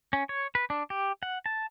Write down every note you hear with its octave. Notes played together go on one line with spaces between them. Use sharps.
C#4
C#5
B4
D4
G4
F#5
A5